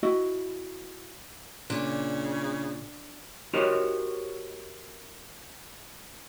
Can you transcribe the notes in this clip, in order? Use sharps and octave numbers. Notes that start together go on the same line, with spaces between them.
E4 F#4 D#5
A#2 C#3 D4
F#4 G4 A#4 C5 C#5 D#5